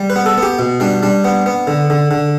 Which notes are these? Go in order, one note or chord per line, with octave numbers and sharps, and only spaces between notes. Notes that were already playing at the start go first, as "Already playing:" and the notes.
Already playing: G3
B4
B3
A4
B3 G4
B2
G3 D4
G3 D4
B3
B3
D3
D3
D3